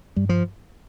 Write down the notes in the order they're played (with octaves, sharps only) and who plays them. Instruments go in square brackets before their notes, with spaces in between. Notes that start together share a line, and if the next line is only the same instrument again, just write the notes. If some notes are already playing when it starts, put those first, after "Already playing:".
[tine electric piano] G2 [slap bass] G3
[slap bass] F3